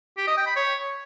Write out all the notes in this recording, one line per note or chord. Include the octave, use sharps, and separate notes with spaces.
G4
D#5
G5
B5
C#5